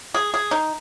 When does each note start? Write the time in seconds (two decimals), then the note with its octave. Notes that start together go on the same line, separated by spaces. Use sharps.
0.14 G#4
0.34 G#4
0.51 D#4